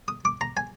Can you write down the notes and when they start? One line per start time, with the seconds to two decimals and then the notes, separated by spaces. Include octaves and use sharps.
0.08 D#6
0.25 D6
0.41 A#5
0.57 G#5